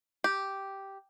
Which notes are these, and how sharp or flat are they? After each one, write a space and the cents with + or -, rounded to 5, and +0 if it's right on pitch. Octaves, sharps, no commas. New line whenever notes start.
G4 -5